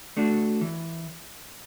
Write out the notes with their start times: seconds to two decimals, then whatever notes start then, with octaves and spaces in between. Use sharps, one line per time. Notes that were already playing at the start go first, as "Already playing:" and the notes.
0.17 A3 D4 F#4
0.61 E3